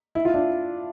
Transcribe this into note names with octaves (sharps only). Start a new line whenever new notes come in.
E4
F4
D4 E4